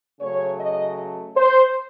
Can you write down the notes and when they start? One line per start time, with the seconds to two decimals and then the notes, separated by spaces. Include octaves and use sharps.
0.21 C#3 F#3 A3 C#5
0.60 D#5
1.36 C5